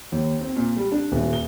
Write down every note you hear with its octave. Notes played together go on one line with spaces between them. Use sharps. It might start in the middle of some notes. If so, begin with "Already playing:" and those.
D#2
C4
A#2
G3
D4
D#1
G7